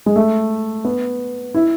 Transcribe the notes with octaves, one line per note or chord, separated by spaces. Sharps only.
G#3
A3
B3
E4